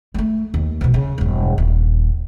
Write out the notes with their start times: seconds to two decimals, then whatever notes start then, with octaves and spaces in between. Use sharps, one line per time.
0.14 G#3 A3
0.54 D#2
0.81 B2 F3
0.94 C#3
1.18 E1 G2
1.58 D#1